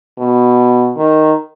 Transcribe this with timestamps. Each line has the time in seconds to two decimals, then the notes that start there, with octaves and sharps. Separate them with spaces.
0.18 B2
0.97 D#3